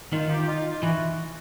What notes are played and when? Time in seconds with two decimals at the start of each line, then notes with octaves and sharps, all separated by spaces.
0.12 D#3 D#4 F4
0.29 F4 G4
0.48 D#4 F4
0.65 D#4 F4
0.83 E3 E4 F#4